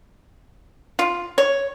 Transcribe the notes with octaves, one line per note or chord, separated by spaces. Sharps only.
F4
C#5